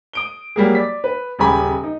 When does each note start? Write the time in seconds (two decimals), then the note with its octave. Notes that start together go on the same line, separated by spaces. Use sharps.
0.13 D#6 D7 G7
0.56 F#3 G3 A#3 G#4
0.75 D5 B6
1.04 B4
1.39 D#1 C#3 G4 G#5 B5 D#6
1.83 D#4